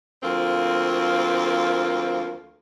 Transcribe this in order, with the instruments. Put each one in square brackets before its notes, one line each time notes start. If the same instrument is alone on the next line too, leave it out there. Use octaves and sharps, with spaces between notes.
[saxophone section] D2 F3 A#3 C4